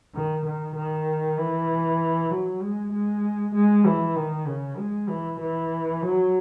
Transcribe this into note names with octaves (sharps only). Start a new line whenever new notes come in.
D#3
D#3
D#3
E3
F#3
G#3
G#3
G#3
E3
D#3
C#3
G#3
E3
E3
F#3